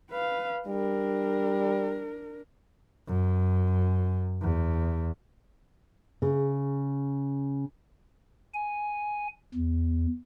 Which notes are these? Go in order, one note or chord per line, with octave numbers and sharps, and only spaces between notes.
B4 F5
G3 D4 A#4
F#2
E2
C#3
G#5
E2